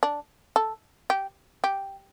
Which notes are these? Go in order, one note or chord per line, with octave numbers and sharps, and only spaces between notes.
D4
A4
G4
G4